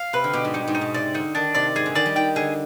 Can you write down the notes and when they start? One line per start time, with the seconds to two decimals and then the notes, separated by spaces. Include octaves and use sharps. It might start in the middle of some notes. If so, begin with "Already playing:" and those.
Already playing: F5
0.13 C3 B4
0.24 D3
0.33 B2 G4
0.45 G#2
0.54 G2 D#4
0.68 G#2
0.75 D#4
0.81 B2
0.94 C3 D5
1.14 D3 D#4
1.35 D#3 D4
1.55 C3 D5
1.75 G#2 G#4
1.86 D3
1.95 D#3 D5
2.06 G3
2.16 D#3 G5
2.36 D3 G#4